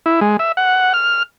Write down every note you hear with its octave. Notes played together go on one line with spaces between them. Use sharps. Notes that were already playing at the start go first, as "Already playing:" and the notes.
E4
G#3
E5
F#5
F6